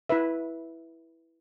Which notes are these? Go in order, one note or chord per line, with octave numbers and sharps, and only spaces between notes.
E4 B4 E5